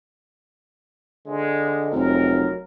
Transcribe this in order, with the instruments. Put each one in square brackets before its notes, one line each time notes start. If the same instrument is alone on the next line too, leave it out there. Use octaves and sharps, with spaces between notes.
[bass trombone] D3 [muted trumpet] G#3
[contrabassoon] F1 [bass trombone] F#3 [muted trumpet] A#4